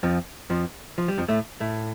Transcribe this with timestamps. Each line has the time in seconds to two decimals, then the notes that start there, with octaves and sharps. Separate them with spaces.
0.03 F2 F3
0.50 F2 F3
0.98 F3
1.08 G3
1.18 F2 F3
1.29 A2 A3
1.60 A2 A3